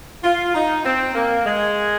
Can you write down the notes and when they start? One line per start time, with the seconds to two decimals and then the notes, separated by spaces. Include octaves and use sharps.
0.24 F4
0.55 D#4
0.84 C4
1.15 A#3
1.45 G#3